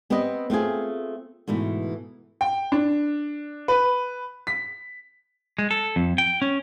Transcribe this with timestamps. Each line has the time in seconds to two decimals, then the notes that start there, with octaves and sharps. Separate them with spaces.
0.10 B3 C4 G4 B4 D#5
0.50 A3 C4 F4 G#4
1.48 G#2 B2 E3 A3
2.41 G5
2.72 D4
3.68 B4
4.47 B6
5.59 G#3
5.71 A4
5.96 F2
6.18 G5
6.42 C#4